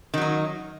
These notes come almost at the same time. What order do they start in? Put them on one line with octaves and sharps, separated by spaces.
D#3 F#3 D#4